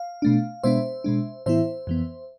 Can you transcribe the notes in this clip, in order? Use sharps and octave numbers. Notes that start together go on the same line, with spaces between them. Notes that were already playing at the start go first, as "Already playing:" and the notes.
Already playing: F5
B2 A3 D4
B2 G#3 B3 D4 C5 E5
B2 G#3 D4
A2 E3 B3 E4 C5 E5
F2 E3 B3